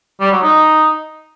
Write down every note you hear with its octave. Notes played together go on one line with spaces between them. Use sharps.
G3
F#3
D#4